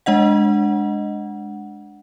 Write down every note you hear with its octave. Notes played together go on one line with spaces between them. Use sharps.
G#3 D4 D#5 F#5